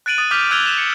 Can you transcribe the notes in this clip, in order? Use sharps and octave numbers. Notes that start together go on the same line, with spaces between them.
F#6 A6 D7 D#7 F#7
D#6 A6
D6 F6 G6 B6 F7
E6 F#6 G#6 D7 F7 G7
E7 F7
C#7